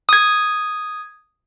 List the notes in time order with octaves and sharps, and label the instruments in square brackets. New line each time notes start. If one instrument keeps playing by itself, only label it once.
[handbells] D#6 G#6